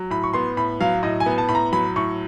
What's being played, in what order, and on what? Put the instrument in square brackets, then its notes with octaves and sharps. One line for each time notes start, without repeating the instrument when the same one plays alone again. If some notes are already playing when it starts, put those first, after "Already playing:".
Already playing: [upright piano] F#3
A2 B5
C#6
B3 C6
A2 B5
F#3 F5
A2 D#5
G#5
B3
A5
A2 B5
A#5
F#3 B5
A2 C#6